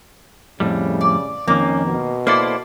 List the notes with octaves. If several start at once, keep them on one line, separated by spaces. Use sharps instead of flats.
F2 A2 C#3 G3
D5
F2 D#3 A#3 C#4
B2
A#3 E4 A4 C5 D5